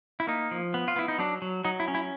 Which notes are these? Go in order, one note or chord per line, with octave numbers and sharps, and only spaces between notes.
E4
A#3 D#4
F3
B3
F4
B3 E4
D#4
F#3 D4
F#3
F#3 D#4
E4
C#4
E4